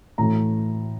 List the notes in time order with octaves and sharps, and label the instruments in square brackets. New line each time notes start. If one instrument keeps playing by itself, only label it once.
[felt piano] A2 E3 A3 A#5